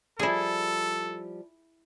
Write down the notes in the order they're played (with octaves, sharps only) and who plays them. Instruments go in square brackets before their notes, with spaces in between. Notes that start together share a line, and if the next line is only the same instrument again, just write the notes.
[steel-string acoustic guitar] F3 G3 [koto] E4 G#4 [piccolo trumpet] A4